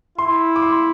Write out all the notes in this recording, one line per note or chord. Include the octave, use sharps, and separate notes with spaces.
E4 C6
D6
C6